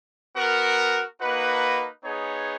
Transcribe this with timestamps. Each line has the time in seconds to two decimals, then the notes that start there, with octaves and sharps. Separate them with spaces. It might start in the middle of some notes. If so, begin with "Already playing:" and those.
0.35 B3 F#4 A#4
1.20 A#3 D#4 F#4 B4
2.04 B3 D#4 G#4 C#5